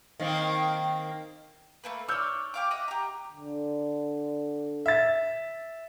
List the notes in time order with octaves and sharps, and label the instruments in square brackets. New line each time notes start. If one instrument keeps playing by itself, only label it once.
[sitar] D#3 A#3 C4
[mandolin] A3 A#3 B4
[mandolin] C#5 D5 [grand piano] E6 F6 G6
[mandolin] G4 F5 D6
D#5 E5 F#5
G4 A#5
[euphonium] D3
[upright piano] E5 A6